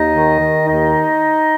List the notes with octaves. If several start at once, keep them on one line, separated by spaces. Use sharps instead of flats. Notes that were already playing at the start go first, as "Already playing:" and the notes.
Already playing: D#2 D#4 D#5
D#3
D#3
D#2 D#4 D#5